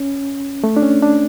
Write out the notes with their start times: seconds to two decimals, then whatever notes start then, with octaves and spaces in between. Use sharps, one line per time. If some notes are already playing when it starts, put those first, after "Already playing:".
Already playing: C#4
0.64 A3
0.77 D4
0.83 C#4
1.02 D4